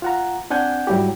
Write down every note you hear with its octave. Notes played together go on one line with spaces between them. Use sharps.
F4 F#5 A#5
C4 D4 F#5 G#5 G6
G#2 F#3 G3 E4 F#4 G4